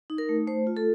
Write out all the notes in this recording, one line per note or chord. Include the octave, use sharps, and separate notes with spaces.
D#4
A#4
A3
A3 C5
F4
A4